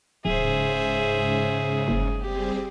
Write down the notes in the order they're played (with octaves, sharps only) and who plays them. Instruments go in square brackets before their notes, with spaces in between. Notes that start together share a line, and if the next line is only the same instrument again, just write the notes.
[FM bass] D1 [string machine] G#2 C#3 [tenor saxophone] G#4 [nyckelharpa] C5 E5
[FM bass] F#1
[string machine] G3 C4 G#4 [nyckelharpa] G4